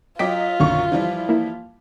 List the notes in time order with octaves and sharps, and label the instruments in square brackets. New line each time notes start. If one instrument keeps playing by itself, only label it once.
[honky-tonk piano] F#3 D#5 B6 [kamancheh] F4 [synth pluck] G5 D6
[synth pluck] B1 D3 D#3 [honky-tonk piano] F#2 A#2 C#6
[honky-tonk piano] E3 F3 G3
[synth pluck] A#3 E4